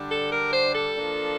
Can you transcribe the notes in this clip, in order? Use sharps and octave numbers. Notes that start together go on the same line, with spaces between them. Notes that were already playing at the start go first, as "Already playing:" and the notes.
Already playing: D3 G3 D4
A4
A#4
C5
A4
F3 A#3 D4